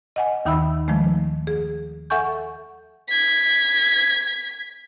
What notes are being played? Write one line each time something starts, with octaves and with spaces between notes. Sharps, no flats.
D#5 F#5 G#5
D#2 D#3 D#4 E5 B5 E6
D#3 F3 G#3 A3
G#4
A4 E5 F#5 G#5 C#6 G6
G#6 B6